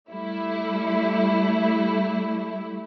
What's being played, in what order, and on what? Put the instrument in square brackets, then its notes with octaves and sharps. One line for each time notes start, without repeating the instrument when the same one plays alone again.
[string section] G3 A3 E4